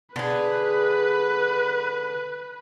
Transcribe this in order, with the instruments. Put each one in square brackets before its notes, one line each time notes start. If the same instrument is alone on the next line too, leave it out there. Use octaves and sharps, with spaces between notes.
[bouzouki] D3 G#4 [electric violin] B4